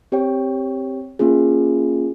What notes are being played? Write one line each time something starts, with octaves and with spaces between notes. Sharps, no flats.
C4 G4 C#5 G5
A#3 C#4 F4 G#4